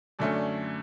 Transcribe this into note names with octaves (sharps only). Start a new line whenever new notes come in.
F#2 D3 A3 C#4 D5
D5